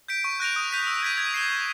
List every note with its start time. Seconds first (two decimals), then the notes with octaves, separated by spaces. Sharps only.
0.08 G6 B6 D7
0.24 C#6
0.40 F#6 A#6 D7 F7
0.56 D#6
0.71 G6 B6 D#7
0.87 E6
1.03 G#6 B6 D#7
1.18 G#6
1.34 C7 E7 G7
1.50 C#6